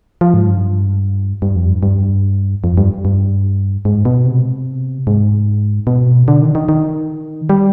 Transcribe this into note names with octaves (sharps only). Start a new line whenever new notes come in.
F3
G#2
G2
G2
F2
G2
G2
F2
G2
G2
G#2
B2
C3
G#2
B2
D3
D#3
D#3
D#3
G3